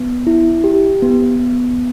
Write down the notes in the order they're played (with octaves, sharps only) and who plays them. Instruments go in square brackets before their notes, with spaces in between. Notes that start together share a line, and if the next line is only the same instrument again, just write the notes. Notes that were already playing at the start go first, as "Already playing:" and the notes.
Already playing: [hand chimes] B3
E4
G4
B3
B3